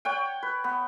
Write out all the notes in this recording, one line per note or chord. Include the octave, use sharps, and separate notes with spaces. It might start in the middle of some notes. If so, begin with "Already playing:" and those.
C#5 F#5 G5
B4
B3